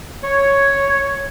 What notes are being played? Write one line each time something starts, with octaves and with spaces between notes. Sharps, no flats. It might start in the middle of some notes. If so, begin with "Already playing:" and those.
C#5